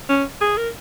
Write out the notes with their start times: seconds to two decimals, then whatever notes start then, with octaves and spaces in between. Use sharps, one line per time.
0.09 C#4
0.41 G#4
0.57 A#4